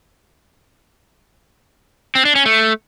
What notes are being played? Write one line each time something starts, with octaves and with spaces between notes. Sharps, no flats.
C4
D4
C#4
A3